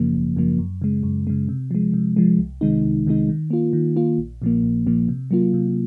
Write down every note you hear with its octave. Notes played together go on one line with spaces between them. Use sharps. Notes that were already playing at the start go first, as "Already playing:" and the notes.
Already playing: G#1 F#2 C#3 F3 A#3
G#1
F#2 C#3 F3 A#3
F#2
C#3 G#3
F#2
C#3 G#3
C3
F3 G#3
C3
F3 G#3
C2
C3 D#3 G#3 D#4
C2
C3 D#3 G#3 D#4
D#3
A#3 F4
D#3
A#3 F4
A#1
A#2 F3 A#3
A#1
A#2 F3 A#3
C3
F#3 A#3 F4
C3